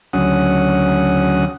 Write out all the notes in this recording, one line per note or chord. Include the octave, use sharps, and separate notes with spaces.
D2 C#3 F#3 C#4 F#5 D#6